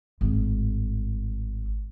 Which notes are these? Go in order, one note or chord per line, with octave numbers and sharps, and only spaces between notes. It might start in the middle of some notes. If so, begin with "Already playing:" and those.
G#1 A2